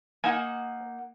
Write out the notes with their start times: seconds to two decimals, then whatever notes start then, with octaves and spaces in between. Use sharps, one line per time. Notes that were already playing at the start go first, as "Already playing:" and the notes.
0.24 A#3 D#4 F#5 G#5